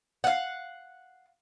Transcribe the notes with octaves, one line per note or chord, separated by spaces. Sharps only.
F5 F#5